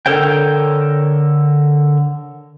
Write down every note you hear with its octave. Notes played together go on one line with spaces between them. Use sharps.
D3 A4 A#4 C#5 G5